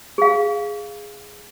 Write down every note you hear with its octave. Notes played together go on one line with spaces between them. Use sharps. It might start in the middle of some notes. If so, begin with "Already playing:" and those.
G#4 F5